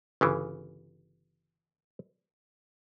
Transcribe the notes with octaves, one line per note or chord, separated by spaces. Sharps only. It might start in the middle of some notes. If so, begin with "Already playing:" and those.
G1 C#3 E3